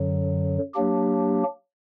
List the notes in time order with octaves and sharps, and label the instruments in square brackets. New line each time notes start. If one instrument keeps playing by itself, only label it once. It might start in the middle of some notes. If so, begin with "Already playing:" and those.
Already playing: [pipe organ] F#2 D3 F#3
F#3 A#3 D4 G4